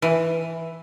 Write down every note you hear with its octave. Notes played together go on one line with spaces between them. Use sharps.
E3